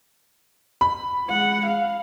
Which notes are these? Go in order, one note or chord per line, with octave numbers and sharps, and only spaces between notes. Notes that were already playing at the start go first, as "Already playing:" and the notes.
B5
G#3 F#5
F5